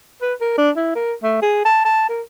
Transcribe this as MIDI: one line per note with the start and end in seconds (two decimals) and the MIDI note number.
0.21 0.34 71
0.41 0.55 70
0.58 0.71 62
0.76 0.95 64
0.95 1.13 70
1.23 1.38 57
1.42 1.60 68
1.65 1.81 81
1.85 2.09 81
2.09 2.22 70